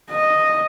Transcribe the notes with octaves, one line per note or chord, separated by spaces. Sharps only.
D#5